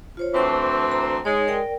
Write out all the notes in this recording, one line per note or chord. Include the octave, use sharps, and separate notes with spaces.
F4 C5 C#5
D2 E3 C4 A5 C#6 D6
A#5
G#3 D#4 C#5
A#4 D5 G5